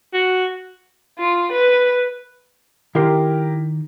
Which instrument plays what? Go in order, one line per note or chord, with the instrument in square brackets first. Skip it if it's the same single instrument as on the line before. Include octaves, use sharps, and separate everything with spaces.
[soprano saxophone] F#4
[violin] F4
B4
[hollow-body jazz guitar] D#3 C6 [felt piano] E4 G4 A#4